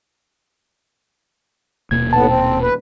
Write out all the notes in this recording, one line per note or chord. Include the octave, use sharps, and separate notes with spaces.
D#1 B2 A#3 G#6
D#2 A2 B3 A5
C4
B4